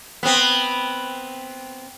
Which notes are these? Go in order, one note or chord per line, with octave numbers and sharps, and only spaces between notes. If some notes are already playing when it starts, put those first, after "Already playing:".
B3 C4